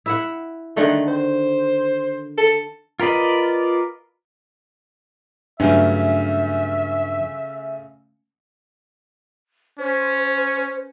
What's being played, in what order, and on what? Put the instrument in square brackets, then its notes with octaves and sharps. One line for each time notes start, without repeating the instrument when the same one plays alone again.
[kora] E4 E5 F#5
[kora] D3 D#3 F#5 [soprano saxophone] A3
[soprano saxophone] C5
A4
[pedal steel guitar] F4 A#4 B4 D5 D#5
[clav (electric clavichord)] G2 F#3 [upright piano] C#3 A3 C#4 [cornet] E5
[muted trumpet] C#4 [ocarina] C5